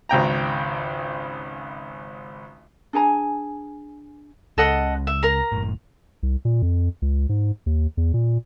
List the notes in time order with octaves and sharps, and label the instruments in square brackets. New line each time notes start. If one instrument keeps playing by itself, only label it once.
[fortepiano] G#1 C#2 G5 A#5
[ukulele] D4 G#4 G#5 A#5
[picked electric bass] C#2 C#3 [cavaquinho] A4 D#5 F#5
[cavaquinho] E5
A#4 A#5
[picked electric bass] F#1 A2
[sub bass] C2
A#2
F2
C#2
G#2
D#2
E2
A#2